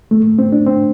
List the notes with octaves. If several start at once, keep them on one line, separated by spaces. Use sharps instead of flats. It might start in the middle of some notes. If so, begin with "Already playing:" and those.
A3
C4
D4
C4